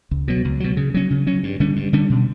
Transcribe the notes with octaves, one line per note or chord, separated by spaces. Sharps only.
C#2
B2 F#3
C#2
B2 F#3
C#3
F#3 C#4
C#3
F#3 C#4
G2
D3 G3 C#4
G2
D3 G3 C#4
B2